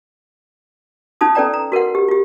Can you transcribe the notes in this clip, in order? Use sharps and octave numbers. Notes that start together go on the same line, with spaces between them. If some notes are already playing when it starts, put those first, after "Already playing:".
C#4 D#4 F4 A5 D#6
C#4 A4 B4 D5 G5 A#5
A#5
F#4 A#4 B4 F#5
G4
F4 G4